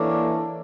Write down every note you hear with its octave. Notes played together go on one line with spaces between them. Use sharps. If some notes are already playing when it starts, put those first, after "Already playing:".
Already playing: E3 A#3 D4 A4 C#5